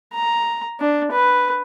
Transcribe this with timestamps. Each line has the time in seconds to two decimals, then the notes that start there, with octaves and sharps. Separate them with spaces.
0.13 A#5
0.80 D4
1.12 B4